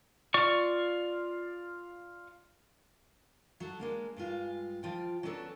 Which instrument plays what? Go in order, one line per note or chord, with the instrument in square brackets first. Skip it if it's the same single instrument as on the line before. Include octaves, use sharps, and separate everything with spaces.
[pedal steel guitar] F4 D5 C#6
[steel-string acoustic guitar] F#3 F#4 A4
G#3 A#3 D4
G2 G#3 F4
F3 F4 G5
F#3 B3 C#4 D4 A4